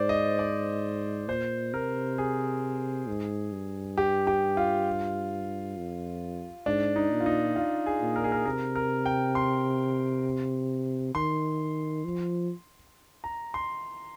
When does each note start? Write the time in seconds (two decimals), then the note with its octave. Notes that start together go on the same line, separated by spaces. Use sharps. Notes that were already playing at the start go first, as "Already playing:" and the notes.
Already playing: G#2 C5 D5
0.09 D#5
0.39 D5
1.29 A#2 C5
1.73 C3 A#4
2.18 G#4
3.08 G#2
3.52 G2
3.98 G4
4.27 G4
4.57 F4
5.77 F2
6.66 G#2 D4
6.96 D#4
7.11 A#2
7.21 F4
7.26 D#4
7.56 F4
7.86 G#4
8.01 A#2
8.16 A#4
8.24 G#4
8.32 A#4
8.46 C3 A#4
8.76 A#4
9.06 G5
9.35 C6
11.14 D#3 C6
12.05 F3
13.24 A#5
13.54 C6